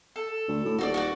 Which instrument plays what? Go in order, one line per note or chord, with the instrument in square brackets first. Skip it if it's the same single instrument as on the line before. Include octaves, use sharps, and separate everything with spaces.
[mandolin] A4
[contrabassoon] D2
A2
[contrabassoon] D#1 [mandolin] F#4 A4 D5
[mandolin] F#4 A4 D5